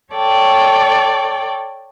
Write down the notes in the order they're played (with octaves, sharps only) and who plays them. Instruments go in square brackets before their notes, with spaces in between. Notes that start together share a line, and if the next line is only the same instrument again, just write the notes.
[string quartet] A4 C#5 D5 G5